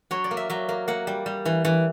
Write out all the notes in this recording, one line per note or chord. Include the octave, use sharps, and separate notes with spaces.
F#3 C#5
D5
A#3
E5
F#3 E5
A#3
A#3 F#5
G3
G3
E3
E3